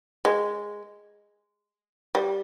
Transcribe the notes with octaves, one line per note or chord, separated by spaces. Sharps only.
G#3
G3